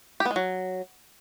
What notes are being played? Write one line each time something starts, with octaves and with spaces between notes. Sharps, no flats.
G4
B3
G#3
F#3